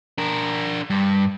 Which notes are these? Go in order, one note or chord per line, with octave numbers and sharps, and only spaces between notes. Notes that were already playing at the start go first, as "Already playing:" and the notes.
D4 A#4
G2